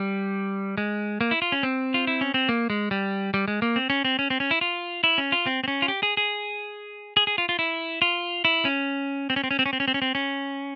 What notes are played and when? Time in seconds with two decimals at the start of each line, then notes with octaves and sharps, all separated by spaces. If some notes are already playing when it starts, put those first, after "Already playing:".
Already playing: G3
0.78 G#3
1.21 A#3
1.31 E4
1.42 F4
1.52 C#4
1.63 C4
1.94 F4
2.07 E4
2.21 C#4
2.34 C4
2.49 A#3
2.70 G#3
2.91 G3
3.34 G3
3.48 G#3
3.62 A#3
3.76 C4
3.90 C#4
4.05 C4
4.19 C#4
4.30 C4
4.40 C#4
4.51 E4
4.61 F4
5.04 E4
5.18 C#4
5.32 F4
5.46 C4
5.64 C4
5.68 C#4
5.82 F4
5.88 G4
6.03 G#4
6.17 G#4
7.17 G#4
7.27 G#4
7.38 F4
7.49 F4
7.59 E4
8.02 F4
8.45 E4
8.65 C#4
9.30 C4
9.36 C#4
9.44 C4
9.51 C#4
9.59 C4
9.66 C#4
9.73 C4
9.80 C#4
9.88 C4
9.94 C#4
10.02 C4
10.15 C#4